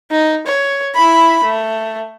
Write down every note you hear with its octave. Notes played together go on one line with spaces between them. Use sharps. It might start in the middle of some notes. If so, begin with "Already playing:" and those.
D#4
C#5
E4 B5
A3